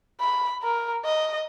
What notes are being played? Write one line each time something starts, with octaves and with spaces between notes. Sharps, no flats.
B5
A#4
D#5